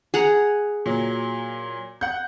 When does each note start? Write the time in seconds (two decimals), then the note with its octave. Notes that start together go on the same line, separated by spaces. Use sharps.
0.14 G#4 F#5 A#5
0.86 A#2 F#3
2.01 F#5 G6